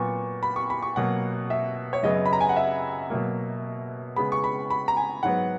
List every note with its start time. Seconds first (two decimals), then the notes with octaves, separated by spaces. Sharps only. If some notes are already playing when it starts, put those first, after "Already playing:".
Already playing: A#2 F#3 B3 C#6
0.43 B5
0.56 C#6
0.70 B5
0.83 C#6
0.96 B2 F#3 A#3 F#5
1.50 E5
1.93 C#5
2.03 F#2 C#3 F#3 B3 D#5
2.26 B5
2.33 A#5
2.41 G#5
2.49 F#5
2.56 E5
3.10 B2 F#3 A#3
4.16 C#3 G#3 B3 B5
4.32 C#6
4.44 B5
4.70 B5
4.88 A#5
4.97 G#5
5.23 G#2 F#3 B3 F#5